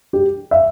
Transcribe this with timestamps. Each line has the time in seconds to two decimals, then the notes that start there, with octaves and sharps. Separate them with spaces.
0.13 G4
0.51 E5